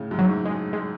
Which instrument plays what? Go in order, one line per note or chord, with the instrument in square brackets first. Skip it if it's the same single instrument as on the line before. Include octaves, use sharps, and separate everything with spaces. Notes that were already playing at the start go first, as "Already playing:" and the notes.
Already playing: [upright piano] A2 C#3
F#2
[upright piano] G#2 [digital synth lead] F#3
[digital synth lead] G#3
G#3